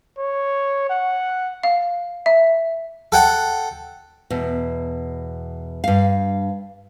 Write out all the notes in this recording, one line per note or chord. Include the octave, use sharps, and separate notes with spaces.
C#5
F#5
F5
E5
A4 F#5 G5
E2 B2
G2 F5